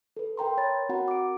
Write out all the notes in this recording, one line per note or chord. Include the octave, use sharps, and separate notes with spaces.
A4 B4
A#4 G5 A#5 C6
C#5 B5 A6
C4 F#4 A#4 F#5 A#5 B5
D6 D7